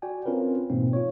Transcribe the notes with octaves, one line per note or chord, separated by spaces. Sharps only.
F#4 D5 G5 G#5
C4 C#4 F4 A#4 B4
G#2 B2 E3 A#3 C4 D#4
F4 C#5